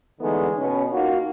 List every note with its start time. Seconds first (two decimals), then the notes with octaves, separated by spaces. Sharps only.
0.20 D3 E3 G#3 A3 B3 D#4
0.56 B2 C#4
0.91 A#3 D#4 F4 F#4